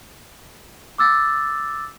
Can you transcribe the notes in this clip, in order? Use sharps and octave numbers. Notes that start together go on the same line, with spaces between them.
D6 E6 A6